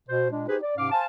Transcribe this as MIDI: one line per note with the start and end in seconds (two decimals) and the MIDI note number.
0.09 0.28 47
0.09 0.28 72
0.31 0.45 46
0.31 0.45 56
0.31 0.45 62
0.48 0.58 63
0.48 0.58 67
0.48 0.58 68
0.48 0.58 71
0.48 0.58 72
0.63 0.73 74
0.77 0.90 44
0.77 0.90 48
0.77 0.90 61
0.77 0.90 77
0.77 0.90 86
0.91 1.06 72
0.91 1.06 77
0.91 1.06 80
0.91 1.06 81